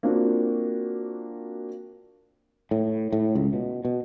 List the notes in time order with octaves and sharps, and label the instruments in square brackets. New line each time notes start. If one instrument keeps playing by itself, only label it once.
[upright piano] A#3 C4 D4 F4 F#4
[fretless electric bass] A2
A2
C#2
B2
B2